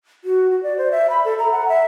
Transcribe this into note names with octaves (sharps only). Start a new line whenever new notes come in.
F#4
F#4
D5
C5
E5
B5
A4
A#5
F#5
E5